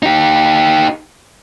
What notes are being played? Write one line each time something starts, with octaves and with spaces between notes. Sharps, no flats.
D#4 G4